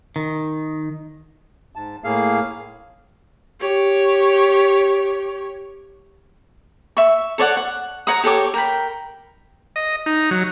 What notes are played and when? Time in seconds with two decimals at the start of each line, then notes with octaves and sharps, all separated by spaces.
0.16 D#3
1.76 G#2 A5
2.04 A2 A#3 G#4 F5
3.60 G4 C#5
6.97 E5 C#6
7.38 A4 C#5 D5 F#5
7.57 F#5
8.07 C#5 F#5 A#5 D#6
8.24 G4 A4 C#5 D6
8.54 A#4 G5 B5
9.76 D#5
10.06 D#4
10.31 F#3